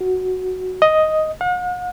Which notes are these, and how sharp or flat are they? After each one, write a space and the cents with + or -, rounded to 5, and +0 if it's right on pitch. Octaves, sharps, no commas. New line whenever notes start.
F#4 +0
D#5 +5
F#5 -45